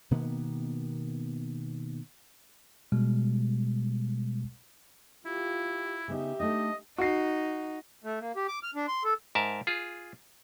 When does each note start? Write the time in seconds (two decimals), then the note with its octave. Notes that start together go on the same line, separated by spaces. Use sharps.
0.11 B2 D#3 A#3 B3
2.92 B2 G3 G#3
5.25 E4 F4 G4
6.08 C#3 B3 D#4 G4 E5
6.40 A3 D4 D#4 D#5
6.98 D#4 F#4 C7
8.04 A3
8.21 A#3
8.36 G4
8.48 D6
8.63 F6
8.75 D4
8.88 C6
9.04 A4
9.35 G#2 A#4 E5 A5
9.67 F4 G#4